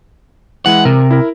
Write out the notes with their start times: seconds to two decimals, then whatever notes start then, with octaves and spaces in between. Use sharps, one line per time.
0.66 E3 G#3 E4 F#5
0.85 C3 A#4
1.11 E4 A#4